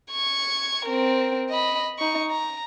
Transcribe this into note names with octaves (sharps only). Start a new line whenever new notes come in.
C#6 G#6
C4 A#4
D#5 B5
D#4 C#6
A#5